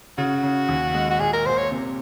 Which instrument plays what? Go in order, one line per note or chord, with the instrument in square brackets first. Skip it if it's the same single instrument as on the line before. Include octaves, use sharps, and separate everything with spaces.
[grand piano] C#3 [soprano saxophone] F#4
[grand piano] C#3
D#2
G#3
[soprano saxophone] F#4
[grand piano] A#2 [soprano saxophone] G#4
[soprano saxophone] A#4
[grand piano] A#2 [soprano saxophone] C5
[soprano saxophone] C#5
[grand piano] C3